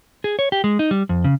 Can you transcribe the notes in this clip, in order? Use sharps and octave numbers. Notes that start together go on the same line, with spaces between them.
G#4
C#5
G4
G#3
D#4
G3
F2
C#3